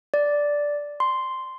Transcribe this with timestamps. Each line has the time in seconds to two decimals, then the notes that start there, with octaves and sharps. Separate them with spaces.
0.14 D5
1.00 C6